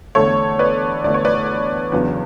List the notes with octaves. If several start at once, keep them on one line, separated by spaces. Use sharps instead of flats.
E2 D3 A3 A4 C#5
B4 D5
E2 D3 A3 D5
C#5
B4 D5
E2 C#3 F#3 B3 D4